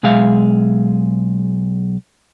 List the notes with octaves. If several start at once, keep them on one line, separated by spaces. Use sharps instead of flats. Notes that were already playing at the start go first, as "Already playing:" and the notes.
B1 G#3 G#4 E5 F5